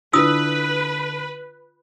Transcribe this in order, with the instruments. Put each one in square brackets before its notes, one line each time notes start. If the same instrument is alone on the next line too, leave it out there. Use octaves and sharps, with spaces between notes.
[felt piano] D3 D4 E4 [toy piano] F4 D#6 E6 [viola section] B4